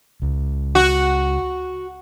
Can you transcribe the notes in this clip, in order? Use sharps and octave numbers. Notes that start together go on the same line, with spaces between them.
C#2
F#4